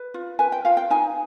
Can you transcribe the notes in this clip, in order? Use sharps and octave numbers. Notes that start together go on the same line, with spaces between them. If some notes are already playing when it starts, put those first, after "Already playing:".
Already playing: B4
F4
B4 G#5
G5
F4 F5
G5
D#4 G#5